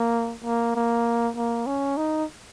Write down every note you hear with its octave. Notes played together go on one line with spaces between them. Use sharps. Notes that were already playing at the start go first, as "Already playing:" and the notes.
Already playing: A#3
A#3
A#3
A#3
C#4
D#4